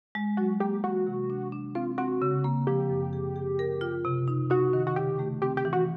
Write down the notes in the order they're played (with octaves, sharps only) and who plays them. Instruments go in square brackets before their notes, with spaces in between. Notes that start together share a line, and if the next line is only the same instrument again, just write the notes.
[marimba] G#3
[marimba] F#3 [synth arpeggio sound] F#4
[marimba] A#3 [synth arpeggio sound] G4
[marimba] E3 [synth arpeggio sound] F#4
[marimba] C3
D4
D4
[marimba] C4 [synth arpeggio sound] F4
[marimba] C4 [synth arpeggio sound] F#4
[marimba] C#3
A#3
[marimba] F3 [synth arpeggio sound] G4
[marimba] F#2
G#4
G#4
A#4
F4
C3
D#4
[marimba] D#4 [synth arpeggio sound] F#4
[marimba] D#3
[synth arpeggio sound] F#4
[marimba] C#3 [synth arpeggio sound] G4
[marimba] A3
[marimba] C4 [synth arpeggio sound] G4
[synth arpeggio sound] G4
[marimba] E3
[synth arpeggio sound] F#4